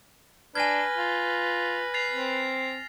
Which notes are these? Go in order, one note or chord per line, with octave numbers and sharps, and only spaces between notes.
D4 B4 G#5 F6 G#6 A#6
F4
A6 C7 F7
C4